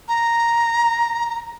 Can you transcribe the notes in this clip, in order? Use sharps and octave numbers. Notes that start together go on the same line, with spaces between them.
A#5